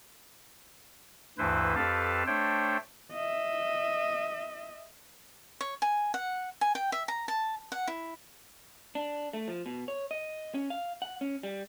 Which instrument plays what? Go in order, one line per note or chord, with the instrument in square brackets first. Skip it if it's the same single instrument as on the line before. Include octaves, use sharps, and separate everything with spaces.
[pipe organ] D2 G2 E3 E4 B4 C5
F2 G4 A4 B4 F5 A5
A3 D4 C5 C#5 G5
[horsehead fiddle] D#5 E5
[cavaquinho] C#5
G#5
F#5
G#5
G5
E5
A#5
A5
F#5
E4
[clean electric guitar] D4
A3
F3
B2
C#5
D#5
C#4
F5
F#5
C#4
G3